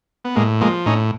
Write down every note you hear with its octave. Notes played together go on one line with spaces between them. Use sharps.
B3
A2 G#3 A#3
F3 G#3 A#3
A2 C#4 D#4